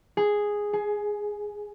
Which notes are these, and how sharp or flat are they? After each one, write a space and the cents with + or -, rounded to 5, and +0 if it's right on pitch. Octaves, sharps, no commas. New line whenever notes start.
G#4 -5
G#4 +20